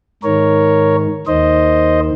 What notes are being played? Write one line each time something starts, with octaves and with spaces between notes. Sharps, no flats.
G#2 D#3 A#4 C#5
D#2 D#3 C5 D#5